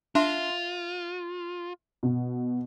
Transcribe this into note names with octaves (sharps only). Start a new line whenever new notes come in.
D4 F4 E5 C6
B2